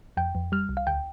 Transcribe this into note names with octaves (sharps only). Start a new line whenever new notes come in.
F2 G5
F2
G3 F6
C2
F5
D2 G5